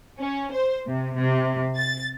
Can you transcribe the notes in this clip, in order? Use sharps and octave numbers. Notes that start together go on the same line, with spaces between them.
C#4
C5
C3
C3
A6